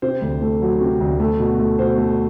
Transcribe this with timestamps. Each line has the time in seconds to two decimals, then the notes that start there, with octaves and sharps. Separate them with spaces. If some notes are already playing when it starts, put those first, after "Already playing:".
0.02 C3 C5
0.22 D2
0.42 A3
0.62 F#3
0.81 C3
1.01 D2
1.20 A3
1.39 B2
1.59 A3
1.79 B2 C5
1.98 A3